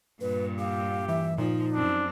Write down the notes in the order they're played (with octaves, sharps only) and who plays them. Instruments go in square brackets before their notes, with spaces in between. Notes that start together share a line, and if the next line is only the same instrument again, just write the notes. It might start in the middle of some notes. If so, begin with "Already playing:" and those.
[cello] G2 A#2 [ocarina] B4
[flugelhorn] G4 [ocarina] F5
[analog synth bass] E3 [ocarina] E5
[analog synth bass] A#2 [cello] F3 [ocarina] D#4
[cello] F#2 C4 [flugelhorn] D4